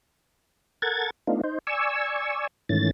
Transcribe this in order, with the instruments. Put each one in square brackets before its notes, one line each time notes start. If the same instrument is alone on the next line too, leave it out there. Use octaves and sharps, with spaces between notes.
[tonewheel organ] A4 A#4 F#5 G#6 A6
A3 B3 D4 D#4 F4
D#4 C5
D5 G#5 C#6 E6
G#2 D#3 E3 A3 C#4 A6